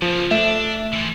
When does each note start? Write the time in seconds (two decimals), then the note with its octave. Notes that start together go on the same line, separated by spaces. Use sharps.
0.02 C#3 F3 A#3
0.31 A3 D4 E5
0.93 E3 F3